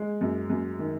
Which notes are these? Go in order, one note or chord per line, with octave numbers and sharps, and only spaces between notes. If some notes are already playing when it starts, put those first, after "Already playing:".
Already playing: G#3
F#2
F#2
D#3